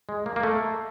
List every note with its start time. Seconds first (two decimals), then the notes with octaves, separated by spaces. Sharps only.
0.09 G#3
0.26 A#3
0.36 A#3
0.43 A3